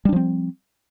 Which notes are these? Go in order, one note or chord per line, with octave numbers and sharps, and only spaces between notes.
F3 G3 C4 D4